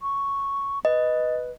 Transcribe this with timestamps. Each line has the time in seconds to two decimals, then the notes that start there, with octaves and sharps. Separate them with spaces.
0.02 C#6
0.85 B4 D#5